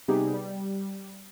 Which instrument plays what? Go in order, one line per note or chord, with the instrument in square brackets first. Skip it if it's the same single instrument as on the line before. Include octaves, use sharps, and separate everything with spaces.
[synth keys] C3 G3 B3 D#4 G4 G#4
G3